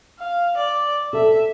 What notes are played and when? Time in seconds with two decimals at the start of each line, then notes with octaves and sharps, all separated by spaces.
0.19 F5
0.58 D5
1.13 A4 E5